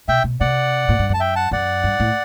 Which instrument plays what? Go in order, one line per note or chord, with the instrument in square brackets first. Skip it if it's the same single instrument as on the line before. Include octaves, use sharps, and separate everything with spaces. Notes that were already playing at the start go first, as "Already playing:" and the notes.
[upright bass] B2 [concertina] E5 G5
[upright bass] B2
[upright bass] C3 [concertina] D5 F#5
[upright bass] A2
G2
[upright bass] F#2 [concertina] A5
[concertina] E5 G5
F#5 A5
[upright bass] F#2 [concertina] D5 F#5
[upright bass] G2
A2